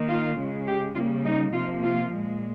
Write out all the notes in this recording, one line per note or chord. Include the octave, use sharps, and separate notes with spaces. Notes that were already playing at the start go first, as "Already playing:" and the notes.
Already playing: D#3 A#3
F4
C#3 G#3
G4
C#3 G3 A#3 F4
D#4
C3 F3 A#3 F4
F4
A#2 G#3